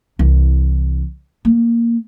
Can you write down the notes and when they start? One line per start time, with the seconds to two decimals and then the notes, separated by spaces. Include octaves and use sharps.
0.19 C2 E3
1.45 A#3